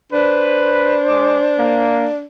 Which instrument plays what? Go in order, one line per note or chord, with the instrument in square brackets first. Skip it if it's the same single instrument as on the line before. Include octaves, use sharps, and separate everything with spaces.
[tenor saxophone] D4 [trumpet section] B4 [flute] C5
[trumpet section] G#3 D6
A#3